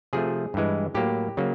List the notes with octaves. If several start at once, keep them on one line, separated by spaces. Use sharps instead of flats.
C3 F3 A3 G#4
G2 E3 G#3
A2 F#3 A#3 G4
C#3 F#3 A#3